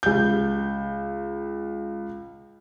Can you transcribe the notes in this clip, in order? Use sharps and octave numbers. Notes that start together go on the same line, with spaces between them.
C#2 G6